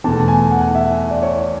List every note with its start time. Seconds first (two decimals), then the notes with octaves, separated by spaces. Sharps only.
0.04 E2 B2 A3 A5
0.20 A5
0.28 G#5
0.51 F#5
0.75 E5
1.11 D5
1.22 C#5